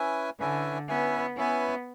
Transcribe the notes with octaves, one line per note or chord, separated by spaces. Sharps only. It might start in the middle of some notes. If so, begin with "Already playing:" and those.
Already playing: C#4 E4 B4 E5 G#5
D3 C#4 E4 B4 E5 G#5
B3 C#4 E4 B4 E5 G#5
B3 C#4 E4 B4 E5 G#5